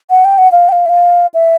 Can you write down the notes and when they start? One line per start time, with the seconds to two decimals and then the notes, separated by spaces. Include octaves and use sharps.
0.10 F#5
0.25 G5
0.38 F#5
0.52 F5
0.69 G5
0.72 F5
0.86 E5
0.89 F5
1.34 E5